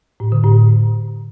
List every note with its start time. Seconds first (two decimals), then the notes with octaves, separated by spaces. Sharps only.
0.20 A2
0.32 D3
0.44 A2